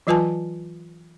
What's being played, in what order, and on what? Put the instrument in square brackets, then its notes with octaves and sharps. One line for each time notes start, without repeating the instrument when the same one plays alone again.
[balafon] E3 F#3 F4 B4 G#5 A5